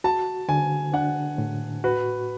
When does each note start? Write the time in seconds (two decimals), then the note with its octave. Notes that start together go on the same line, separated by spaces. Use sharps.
0.04 F#4 A5
0.48 D3 G#5
0.94 D4 F#5
1.38 A2
1.84 F#4 B4